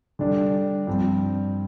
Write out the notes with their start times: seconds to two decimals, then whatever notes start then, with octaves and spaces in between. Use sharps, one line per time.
0.19 D3 G3 D4
0.87 G2 F3 C4